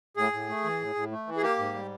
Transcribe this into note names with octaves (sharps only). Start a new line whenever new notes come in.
A2 G#4
A2
A3
E3
A2
A2
A3
E3
G#4
A#3 G4
G#2
G3